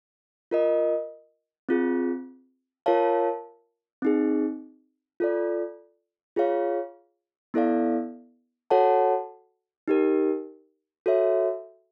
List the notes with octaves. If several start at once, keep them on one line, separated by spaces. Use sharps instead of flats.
F4 A#4 D#5
C4 F4 G#4
F4 A#4 C#5 F5 A5
C4 D#4 G#4
F4 A4 D5
F4 G#4 C#5 F5
B3 E4 A4 D5 F5
F#4 A4 C#5 F#5 A5
D#4 G4 A#4
F#4 A4 C#5 E5